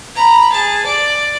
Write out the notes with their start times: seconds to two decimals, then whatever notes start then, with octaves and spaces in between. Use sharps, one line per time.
0.15 A#5 B5
0.52 G#4 A5
0.86 D5